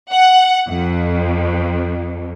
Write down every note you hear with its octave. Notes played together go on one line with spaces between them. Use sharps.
F#5
F2